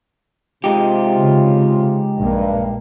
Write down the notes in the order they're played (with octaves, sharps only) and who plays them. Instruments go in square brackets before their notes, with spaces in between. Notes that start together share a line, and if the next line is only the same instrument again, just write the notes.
[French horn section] C3 F4 [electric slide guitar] G#3 D#4 G4
[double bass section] C#3
[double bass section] A#1 A#3 [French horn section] G2